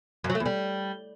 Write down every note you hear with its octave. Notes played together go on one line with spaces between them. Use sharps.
F#2
F#3
A3
E2
G3